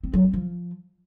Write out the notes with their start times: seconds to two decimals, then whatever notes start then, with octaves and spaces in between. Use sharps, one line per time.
0.04 C4
0.13 F#3
0.23 C4
0.33 F3